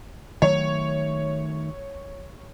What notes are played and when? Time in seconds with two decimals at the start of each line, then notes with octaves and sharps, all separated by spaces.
0.42 D#3 F#3 A3 C#5